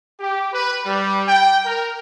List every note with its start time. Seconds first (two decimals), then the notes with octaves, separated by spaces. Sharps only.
0.20 G4
0.53 B4
0.85 G3
1.27 G5
1.66 A#4